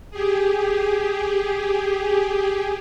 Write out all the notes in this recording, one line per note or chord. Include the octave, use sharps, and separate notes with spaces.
G4 G#4